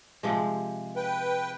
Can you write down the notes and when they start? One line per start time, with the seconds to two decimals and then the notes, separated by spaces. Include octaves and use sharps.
0.23 C3 F3 G#3
0.96 B4 G5